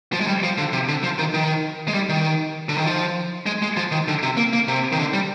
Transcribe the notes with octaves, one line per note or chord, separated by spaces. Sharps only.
F3
G#3
G3
F3
D3
C3
D3
F3
D#3
D#3
G#3
G3
D#3
D3
D#3
F3
G#3
G#3
F3
D#3
D3
C3
A#3
A#3
C3
D#3
D3
G3